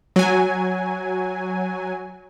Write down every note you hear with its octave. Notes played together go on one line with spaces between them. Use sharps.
F#3 G#5